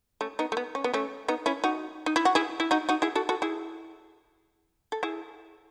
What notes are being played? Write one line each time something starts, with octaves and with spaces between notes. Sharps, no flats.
A3 C#4
B3 D#4
A3
B3
C#4
B3
A3 C#4
B3 D#4
C#4 E4
D#4 F#4
D#4
E4
F#4
E4 G#4
E4
D#4 F#4
D#4 F#4
E4 G#4
F#4 A4
F#4 A4
E4 G#4
A4
E4 G#4